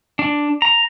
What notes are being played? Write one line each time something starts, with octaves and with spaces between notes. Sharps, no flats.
D4
A#5